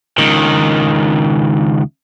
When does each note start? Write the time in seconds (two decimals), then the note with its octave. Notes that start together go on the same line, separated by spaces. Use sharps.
0.18 C#2 D#3